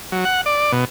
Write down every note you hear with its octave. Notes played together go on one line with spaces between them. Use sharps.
F#3
F#5
D5
B2